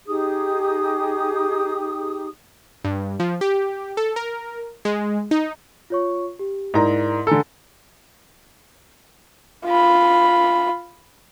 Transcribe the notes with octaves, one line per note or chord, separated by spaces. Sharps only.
D#4 G4 G#4 D#6
G2
F3
G4
A4
A#4
G#3
D#4
F4 C#5 C#6
G4
G#2 E4 A#4 D5 A#5
D3 A4 G#5 A#5
F4 B5